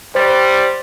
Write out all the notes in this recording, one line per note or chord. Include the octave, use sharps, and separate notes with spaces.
G3 C5 A6